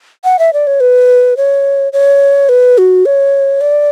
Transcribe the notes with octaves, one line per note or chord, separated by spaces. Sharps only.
F#5
E5
D5
C#5
B4
C#5
C#5
B4
F#4
C#5
D5